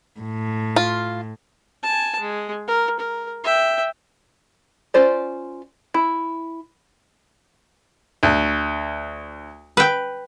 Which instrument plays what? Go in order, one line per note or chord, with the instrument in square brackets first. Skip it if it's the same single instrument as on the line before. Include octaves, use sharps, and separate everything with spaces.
[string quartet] A2
[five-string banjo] F4
[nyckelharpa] G#5 A5
G#3
A#4
A#4
E5 G5
[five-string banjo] C#4 F4 C5 D5
E4
[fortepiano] D2
[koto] B4 G5